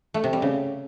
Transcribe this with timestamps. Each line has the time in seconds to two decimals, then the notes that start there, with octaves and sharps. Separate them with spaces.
0.14 A3
0.24 C3
0.33 G3
0.42 C#3